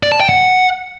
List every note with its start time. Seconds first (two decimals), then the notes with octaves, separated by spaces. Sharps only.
0.03 D5
0.12 A5
0.20 G5
0.29 F#5